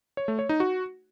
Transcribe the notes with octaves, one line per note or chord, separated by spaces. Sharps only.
C#5
A3
C#5
D#4
F#4